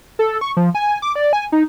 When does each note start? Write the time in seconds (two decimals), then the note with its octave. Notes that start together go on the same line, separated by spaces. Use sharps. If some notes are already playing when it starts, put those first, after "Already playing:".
0.19 A4
0.41 C#6
0.57 F3
0.75 G#5
1.02 D6
1.16 D5
1.33 G#5
1.52 D#4